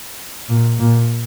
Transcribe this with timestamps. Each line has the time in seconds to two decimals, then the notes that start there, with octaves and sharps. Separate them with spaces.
0.49 A#2
0.79 A#2